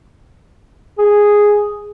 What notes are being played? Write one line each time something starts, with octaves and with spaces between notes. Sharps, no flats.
G#4